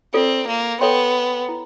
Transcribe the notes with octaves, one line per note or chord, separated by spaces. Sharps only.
C4 F4 A4 D5
A#3
B3 A4 C#5 E5 G5 C6
E4